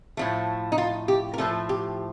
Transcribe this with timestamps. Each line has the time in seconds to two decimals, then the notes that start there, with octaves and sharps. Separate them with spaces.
0.17 A2 F3 A3
0.72 D#4
0.78 F4
1.08 G4
1.34 A#4
1.38 A2 F3 A3 A4
1.69 G4